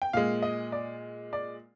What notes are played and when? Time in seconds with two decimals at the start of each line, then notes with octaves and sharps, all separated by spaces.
0.02 G5
0.13 A#2 G#3 F5
0.42 D#5
0.72 D5
1.33 D5